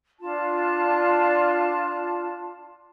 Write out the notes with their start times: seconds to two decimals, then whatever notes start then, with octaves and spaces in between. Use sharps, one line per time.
0.20 D4 F4 A5